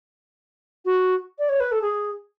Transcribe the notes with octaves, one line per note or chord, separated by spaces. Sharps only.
F#4
D5
C#5
B4
A4
G#4